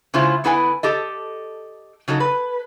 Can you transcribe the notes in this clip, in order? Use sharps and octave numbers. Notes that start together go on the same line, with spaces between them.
C#3 G#3 E4 F4 C5
D3 B3 E4 B4 F#5 G#5
G4 A4 D#5
C#3 F#3 D#4 A4
B4